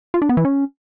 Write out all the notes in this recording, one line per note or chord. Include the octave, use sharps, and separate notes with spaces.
F4
D4
B3
E3
C#4